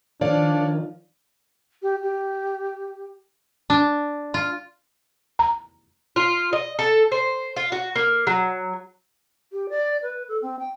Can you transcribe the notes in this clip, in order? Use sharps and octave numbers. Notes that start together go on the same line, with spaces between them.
D#3 F3 D4 C#5 D5 F5
G4
G4
D4
F4
A#5
F4
D#5
A4
C5
F4
F#4
A#3
F#3
G4
D5
B4
A4
C4
G5